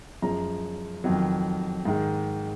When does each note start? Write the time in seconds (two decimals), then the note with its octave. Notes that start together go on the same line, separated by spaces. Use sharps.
0.22 F#2 F3 G#3 A#5
1.04 F2 D#3 F#3
1.85 G#2 D#3 G#3